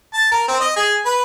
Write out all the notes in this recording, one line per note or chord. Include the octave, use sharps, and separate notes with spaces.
A5
A#4
C4
D#5
G#4
B4